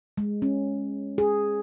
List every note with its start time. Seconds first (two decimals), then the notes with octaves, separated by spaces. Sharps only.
0.18 G#3
0.42 C#4
1.18 G#4